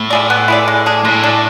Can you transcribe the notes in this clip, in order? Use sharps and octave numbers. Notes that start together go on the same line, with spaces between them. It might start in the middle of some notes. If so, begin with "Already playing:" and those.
Already playing: A2
E4 G#4 D5
B3
E4 G#4 D5
G#3
D4 G#4
A2 G#3
D4 G#4